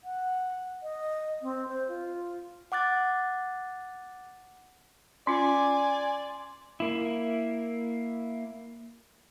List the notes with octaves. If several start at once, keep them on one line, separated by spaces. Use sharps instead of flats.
F#5
D#5
C4
C5
F4
F#5 D6 F#6 A6
C#4 F4 D5 G#5 C6
A#3 E4